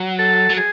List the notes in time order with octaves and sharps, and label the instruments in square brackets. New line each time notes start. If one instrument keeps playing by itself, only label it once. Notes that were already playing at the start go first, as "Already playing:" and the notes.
Already playing: [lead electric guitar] F#3
[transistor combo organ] A4
[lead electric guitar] F#3
[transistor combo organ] G#4